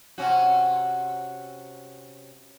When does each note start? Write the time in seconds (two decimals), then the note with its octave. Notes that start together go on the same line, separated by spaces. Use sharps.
0.18 C3 C#4 F#4